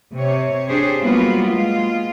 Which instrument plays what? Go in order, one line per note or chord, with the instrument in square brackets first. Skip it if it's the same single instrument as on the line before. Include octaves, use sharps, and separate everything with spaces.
[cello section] C3 C#5
D4 G4 G#4 C5 C#5
F#3 G3 A#3 B3 F4 F#4
G#3 F4